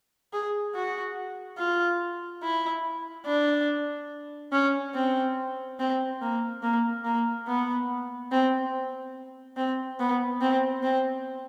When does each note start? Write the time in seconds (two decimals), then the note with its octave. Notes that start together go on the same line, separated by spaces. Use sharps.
0.33 G#4
0.75 F#4
1.58 F4
2.43 E4
3.26 D4
4.52 C#4
4.94 C4
5.79 C4
6.21 A#3
6.62 A#3
7.05 A#3
7.47 B3
8.31 C4
9.57 C4
9.99 B3
10.41 C4
10.83 C4